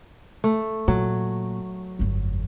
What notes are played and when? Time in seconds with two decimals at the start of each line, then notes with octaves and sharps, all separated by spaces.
0.44 A3
0.88 A#2 F#3
1.99 G1 F2